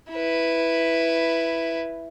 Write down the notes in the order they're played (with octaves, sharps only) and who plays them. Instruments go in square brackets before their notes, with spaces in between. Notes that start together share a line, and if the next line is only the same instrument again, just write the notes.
[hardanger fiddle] E4 B4